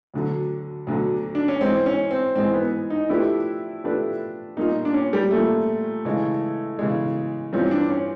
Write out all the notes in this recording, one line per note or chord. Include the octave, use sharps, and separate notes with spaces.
D2 D3 F#3
D2 D3 F#3
D4
C#4
G#2 E3 G#3 C4
C#4
C4
G#2 E3 G#3 C4
B3
D#4
F3 A3 D4 E4 G4 B4
F3 A3 D4 G4 B4
A#2 G3 A#3 C#4 D#4 F4
D4
C#4
G3
A#2 G3 A3 A#3 C#4 F4
C#3 E3 G#3
C#3 E3 G#3
G2 E3 G3 C4 C#4 F4
D4
C#4